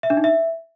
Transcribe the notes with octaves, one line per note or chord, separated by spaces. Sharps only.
E5
D4
D#4
E5